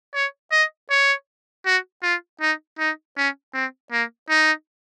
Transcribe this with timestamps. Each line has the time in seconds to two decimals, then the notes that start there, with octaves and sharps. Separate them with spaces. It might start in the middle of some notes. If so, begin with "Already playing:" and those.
0.14 C#5
0.52 D#5
0.91 C#5
1.66 F#4
2.03 F4
2.41 D#4
2.79 D#4
3.17 C#4
3.54 C4
3.92 A#3
4.29 D#4